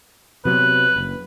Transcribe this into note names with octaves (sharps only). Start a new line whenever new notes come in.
C3 F#3 B3 B4
F#1